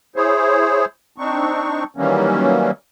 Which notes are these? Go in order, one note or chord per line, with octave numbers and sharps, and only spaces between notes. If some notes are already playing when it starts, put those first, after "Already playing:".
E4 G#4 C5 C#5
C4 D4 D#4 C#6
D#3 E3 F#3 G3 A#3 C#4